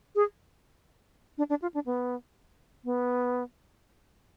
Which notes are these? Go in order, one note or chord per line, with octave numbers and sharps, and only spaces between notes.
G#4
D4
D4
F4
D4
B3
B3